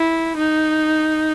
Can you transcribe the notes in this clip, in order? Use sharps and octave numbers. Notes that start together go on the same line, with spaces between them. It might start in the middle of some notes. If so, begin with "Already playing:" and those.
Already playing: E4
D#4